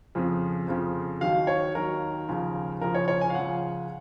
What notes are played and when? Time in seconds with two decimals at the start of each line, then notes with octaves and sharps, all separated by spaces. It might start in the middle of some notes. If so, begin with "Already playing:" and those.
0.15 F2 C#3 F3
0.68 F2 C#3 F3
1.21 D#2 D#3 F#3 F5
1.47 C#5
1.75 D#2 D#3 F#3 A#4
2.28 D#2 C#3 F3
2.81 D#2 C#3 F3 A#4
2.94 C#5
3.08 C#5
3.21 G#5
3.30 F5
3.34 C#2 C#3 F3 F#5